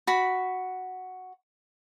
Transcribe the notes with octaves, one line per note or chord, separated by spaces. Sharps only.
F#4 B5